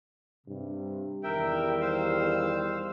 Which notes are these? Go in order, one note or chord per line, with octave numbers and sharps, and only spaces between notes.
G2 C3
E2 D#3 G3 A#4 E5 G5
C5 F5 E6